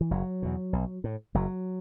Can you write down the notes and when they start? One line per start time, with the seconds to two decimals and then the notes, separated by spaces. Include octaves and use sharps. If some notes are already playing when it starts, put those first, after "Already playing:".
0.01 E3
0.11 F#1 F#3
0.42 E2 B2
0.73 B1
1.04 A2
1.34 F#1 F#3